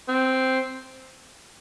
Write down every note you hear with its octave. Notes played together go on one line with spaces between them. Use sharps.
C4